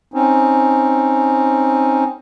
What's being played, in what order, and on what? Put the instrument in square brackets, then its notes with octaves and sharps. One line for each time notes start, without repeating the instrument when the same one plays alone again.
[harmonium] C4 C#4 D#4